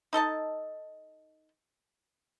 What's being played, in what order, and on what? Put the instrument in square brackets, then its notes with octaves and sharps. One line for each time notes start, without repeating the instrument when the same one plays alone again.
[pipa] D#4 A4 D#5 A5